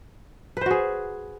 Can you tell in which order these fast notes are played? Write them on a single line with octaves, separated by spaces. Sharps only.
B4 C5 F#4 G#4